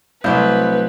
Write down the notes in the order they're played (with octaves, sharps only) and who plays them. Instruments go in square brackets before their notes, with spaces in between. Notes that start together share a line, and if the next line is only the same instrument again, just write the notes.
[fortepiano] C2 [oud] F#3 C4 [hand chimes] A3 G6 [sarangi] B4